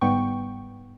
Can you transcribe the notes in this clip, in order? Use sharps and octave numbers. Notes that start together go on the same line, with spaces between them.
G1 G#2 G3 B3 G5 C#6